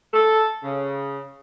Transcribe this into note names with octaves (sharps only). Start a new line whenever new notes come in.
A4
C#3